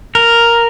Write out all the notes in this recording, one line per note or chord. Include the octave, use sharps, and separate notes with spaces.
A#4